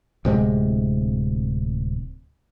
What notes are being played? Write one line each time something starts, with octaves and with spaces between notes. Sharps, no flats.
D1 C3 G#3